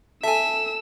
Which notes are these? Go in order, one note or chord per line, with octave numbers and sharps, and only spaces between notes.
A4 E5 G#5 E6